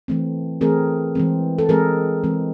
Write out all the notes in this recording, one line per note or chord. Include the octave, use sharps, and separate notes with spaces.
E3 A3 C4
E3 A3 C4 G#4 A#4
E3 G#3 C4
A4
E3 G#3 C4 G#4 A#4
E3 G#3 C4